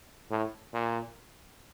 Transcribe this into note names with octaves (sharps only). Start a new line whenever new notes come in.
A2
A#2